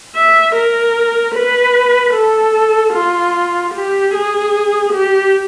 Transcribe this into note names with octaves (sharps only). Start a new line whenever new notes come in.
E5
A#4
B4
A4
F4
G4
G#4
G4